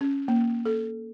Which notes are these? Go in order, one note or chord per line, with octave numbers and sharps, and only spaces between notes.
C#4
A#3
A4